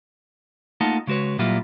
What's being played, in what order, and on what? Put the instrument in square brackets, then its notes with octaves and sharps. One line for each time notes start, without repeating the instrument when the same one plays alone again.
[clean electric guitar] A3 A#3 D#4 F4 F#5 A5
C#3 G#3 F#4 B4 C#5
A#2 F#3 G3 A#3 E4 F4